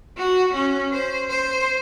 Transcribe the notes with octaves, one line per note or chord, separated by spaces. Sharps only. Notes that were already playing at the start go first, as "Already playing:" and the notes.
F#4
C#4
C5
C5